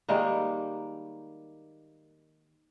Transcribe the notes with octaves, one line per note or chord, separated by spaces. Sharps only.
D#3 G3 G#3 A#3